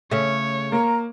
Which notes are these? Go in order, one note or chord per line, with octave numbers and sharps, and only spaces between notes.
C#3 A3 C#5
A#3 A#5